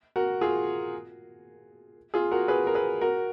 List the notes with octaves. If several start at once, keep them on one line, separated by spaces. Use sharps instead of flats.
F#4 A#4
F4 G#4
F4 G#4
F#4 A#4
G#4 B4
A#4
G#4 B4
F#4 A#4